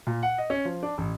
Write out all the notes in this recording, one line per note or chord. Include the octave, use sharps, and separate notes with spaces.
A#2
F#5
D#5
C#4
F3
D4
A1